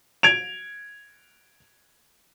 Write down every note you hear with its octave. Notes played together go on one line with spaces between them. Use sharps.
G#6 D7 F7